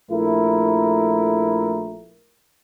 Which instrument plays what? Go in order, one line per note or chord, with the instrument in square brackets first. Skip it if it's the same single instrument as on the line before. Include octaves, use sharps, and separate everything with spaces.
[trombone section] A#1 A3 E4 A#4